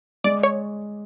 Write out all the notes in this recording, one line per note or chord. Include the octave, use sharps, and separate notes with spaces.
G#3 D5
C#5